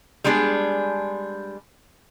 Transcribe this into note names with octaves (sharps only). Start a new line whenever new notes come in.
G3 G#3 B3 D4 G#4